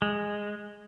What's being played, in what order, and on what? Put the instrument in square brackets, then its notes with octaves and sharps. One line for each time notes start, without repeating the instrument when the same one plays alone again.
[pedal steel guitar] G#3